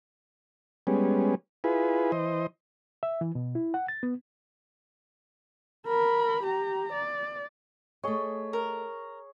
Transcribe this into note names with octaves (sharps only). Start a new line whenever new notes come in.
G3 G#3 B3 C#4
E4 F4 G#4 B4
E3 C5 D#5
E5
E3
B2
E4
F#5
A6
B3
A#4 B5
G4 A#5
D5
A3 G#4 C#5 D#5
A#4